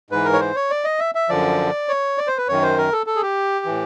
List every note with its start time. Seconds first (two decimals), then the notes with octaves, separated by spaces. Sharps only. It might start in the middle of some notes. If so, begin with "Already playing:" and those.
0.11 G#2 E3 B4
0.25 A#4
0.33 C#5
0.40 C5
0.56 C#5
0.70 D5
0.84 D#5
1.00 E5
1.15 E5
1.29 F#2 D3 F3 D5
1.89 C#5
2.18 D5
2.27 C5
2.37 B4
2.48 F#2 D#3 C#5
2.62 C5
2.78 A#4
2.93 A4
3.06 A4
3.16 G#4
3.22 G4
3.66 A2 E3